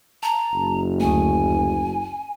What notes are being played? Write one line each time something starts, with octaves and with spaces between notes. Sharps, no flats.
A5 A#5
F#1
D2 A3 G#5